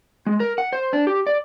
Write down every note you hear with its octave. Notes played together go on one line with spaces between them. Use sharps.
G#3
A#4
F#5
C5
D4
G4
D5